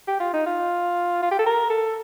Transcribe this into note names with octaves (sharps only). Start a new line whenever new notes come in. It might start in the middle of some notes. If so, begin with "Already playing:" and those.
G4
F4
D#4
F4
F4
G4
A4
A#4
A4